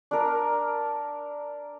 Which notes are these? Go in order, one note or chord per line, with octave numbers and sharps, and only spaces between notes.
D4 A#4